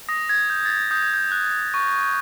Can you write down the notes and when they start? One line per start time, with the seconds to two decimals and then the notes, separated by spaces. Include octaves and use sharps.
0.09 D#6 A#6
0.29 G#6
0.50 G6
0.65 A6
0.70 G#6
0.91 D#6 G6
1.03 G#6
1.14 G6
1.32 F#6
1.74 C#6